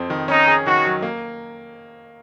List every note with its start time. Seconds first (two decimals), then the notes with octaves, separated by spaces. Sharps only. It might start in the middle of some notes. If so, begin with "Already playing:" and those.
Already playing: F2 C4
0.10 D#3
0.28 C#4 D#4
0.48 G#4
0.66 D#3 F#4
0.85 F#3
1.02 A#3